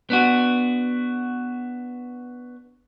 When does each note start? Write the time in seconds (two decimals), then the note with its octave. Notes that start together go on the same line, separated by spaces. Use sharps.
0.10 B3 D4 F#4